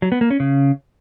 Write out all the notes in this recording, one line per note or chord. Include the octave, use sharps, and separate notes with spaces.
F#3
B3
A#3
C#4
C#3